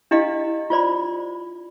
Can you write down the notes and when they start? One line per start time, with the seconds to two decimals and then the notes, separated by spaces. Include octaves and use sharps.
0.11 D4 E4 G4 D#5 F5
0.70 F4 C5 D5 B5